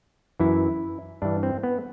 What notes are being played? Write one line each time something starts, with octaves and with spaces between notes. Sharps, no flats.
F#2 E3 E4
G2 E3 D4
C4
B3